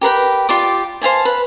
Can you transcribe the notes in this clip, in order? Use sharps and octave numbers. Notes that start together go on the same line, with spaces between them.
G4 A#4 B4 G5
F4 G4 D5 D6
C5 F5 G#5 A5
B4